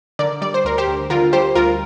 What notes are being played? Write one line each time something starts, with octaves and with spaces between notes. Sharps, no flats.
D3 A#4 D5
G3 D5
C5
D2 A#4
G4 C5
D2
D3 F4 A#4
G3 G4 C5
D2 F4 A#4